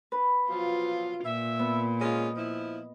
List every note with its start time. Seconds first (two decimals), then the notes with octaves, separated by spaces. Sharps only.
0.12 B4
0.49 B2 F3 F#3 F4
1.25 A#2 E5
1.59 B3
2.01 G#3 C#4 F4 D#5
2.37 F3 E4